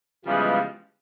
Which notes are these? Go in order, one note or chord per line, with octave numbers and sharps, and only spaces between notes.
C#3 E3 F3 G3 G#3 B3